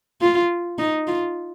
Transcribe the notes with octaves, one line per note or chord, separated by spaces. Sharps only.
F4
D#4
F4